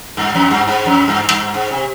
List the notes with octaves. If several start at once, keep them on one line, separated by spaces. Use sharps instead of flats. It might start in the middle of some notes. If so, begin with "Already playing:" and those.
G2
F2
G2
G#2
F2
G2
G2
G#2
C3